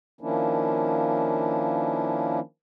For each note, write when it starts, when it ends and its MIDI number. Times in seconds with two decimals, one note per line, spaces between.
0.21 2.40 51
0.21 2.40 53
0.21 2.40 58
0.21 2.40 61
0.21 2.40 62
0.21 2.40 64